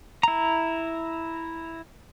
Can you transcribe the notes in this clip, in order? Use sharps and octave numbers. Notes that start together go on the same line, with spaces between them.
E4 A#5